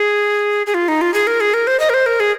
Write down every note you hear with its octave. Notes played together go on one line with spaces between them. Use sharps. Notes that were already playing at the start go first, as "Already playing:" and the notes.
Already playing: G#4
G#4
F4
D#4
F4
G#4
A#4
G#4
A#4
C5
D#5
A#4
C5
A#4
G#4